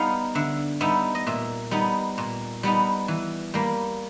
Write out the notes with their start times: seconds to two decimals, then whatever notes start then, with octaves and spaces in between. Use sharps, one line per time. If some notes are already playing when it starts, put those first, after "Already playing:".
Already playing: G3 B3 D#4 F5
0.35 D3 E5
0.81 G3 B3 D#4 E5
1.15 D#5
1.27 A#2 E5
1.71 G3 B3 D#4
2.18 A#2
2.63 G3 B3 D#4
3.08 E3
3.54 G3 A#3